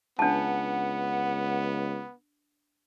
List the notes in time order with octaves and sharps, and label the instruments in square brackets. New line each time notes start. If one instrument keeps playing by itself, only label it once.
[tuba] C#2 [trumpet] B3 [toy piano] D4 A5 [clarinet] F#5